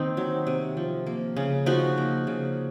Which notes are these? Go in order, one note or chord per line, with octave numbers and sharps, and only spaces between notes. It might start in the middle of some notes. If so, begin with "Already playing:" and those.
Already playing: D#3 A#3 C4 D#4
F#3
C3
F3
A#3
C#3
F3 D#4 F#4
A#3
C#3